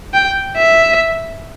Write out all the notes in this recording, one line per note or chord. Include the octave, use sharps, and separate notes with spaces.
G5
E5